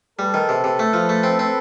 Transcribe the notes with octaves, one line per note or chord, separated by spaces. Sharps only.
G3 A4 B4
D#3
C3
C3
A3
F3
A3
C4
C4